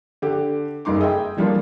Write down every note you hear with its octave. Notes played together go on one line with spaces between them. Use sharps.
D3 G4
F#1 G3 D#4 C6 D6
G#4 D#5 E5 G5
E3 F3 G3 A#3 D4 F4